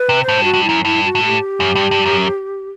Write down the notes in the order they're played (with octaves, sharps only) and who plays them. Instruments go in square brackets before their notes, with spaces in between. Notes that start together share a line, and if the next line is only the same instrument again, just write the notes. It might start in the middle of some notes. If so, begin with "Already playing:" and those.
Already playing: [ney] B4
[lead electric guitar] C3
[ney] C5
[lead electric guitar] A2
G2
[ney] F#4
[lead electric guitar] G2
[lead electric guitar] F#2 [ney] E4
[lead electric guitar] G2 [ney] E4
[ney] F#4
[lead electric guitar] A2
[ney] G4
[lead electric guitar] F#2
G2
G2
F#2